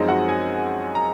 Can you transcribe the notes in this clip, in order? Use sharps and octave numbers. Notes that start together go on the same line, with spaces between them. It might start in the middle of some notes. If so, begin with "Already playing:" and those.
Already playing: F#2 F3 G#3 C4 D#4 D#5
F#4 F#5
G#4 G#5
A#5